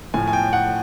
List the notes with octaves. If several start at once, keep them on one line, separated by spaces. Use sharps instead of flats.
A2 F3 A3 G#5
G#5
G5
F#5